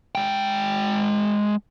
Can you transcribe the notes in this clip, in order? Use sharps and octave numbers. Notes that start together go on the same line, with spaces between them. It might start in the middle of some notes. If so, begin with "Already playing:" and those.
G#3 G5